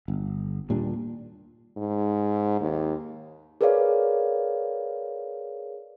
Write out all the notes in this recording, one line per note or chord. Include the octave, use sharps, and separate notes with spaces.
G1
D#2 A#2 G3 D4
G#2
D#2
G#4 A#4 B4 C#5 D5 F5